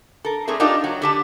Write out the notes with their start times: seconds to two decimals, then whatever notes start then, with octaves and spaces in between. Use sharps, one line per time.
0.25 A4 A#4
0.48 A3 C4 D4 G#4 A#4
0.60 D4 D#4 F4 G4 A#4 D5
0.84 F#3
1.02 D3 G4 A5